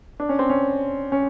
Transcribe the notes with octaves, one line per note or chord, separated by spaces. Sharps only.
D4
C#4
C4
C#4
C#4